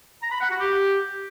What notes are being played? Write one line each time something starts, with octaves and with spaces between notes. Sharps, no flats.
A#5
B5
F#5
F#4
G4